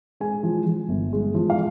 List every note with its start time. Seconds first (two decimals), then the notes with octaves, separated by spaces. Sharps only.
0.20 G#3 G#5
0.43 F3
0.66 F3
0.89 G1
1.13 G#3
1.34 F3
1.50 F5